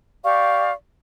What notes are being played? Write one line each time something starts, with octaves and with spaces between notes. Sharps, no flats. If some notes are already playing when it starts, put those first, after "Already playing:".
G4 D5 F5 C#6